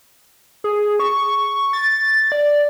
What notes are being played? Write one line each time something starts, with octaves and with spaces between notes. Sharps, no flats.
G#4
C#6
A6
D5